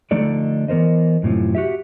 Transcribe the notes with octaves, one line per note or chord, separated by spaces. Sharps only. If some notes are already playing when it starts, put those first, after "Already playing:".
D3 F3 A3 D#4 A4 D5
E3 B3 A#4 C5 D#5
F#2 A2 C3 F3
F#4 G4 E5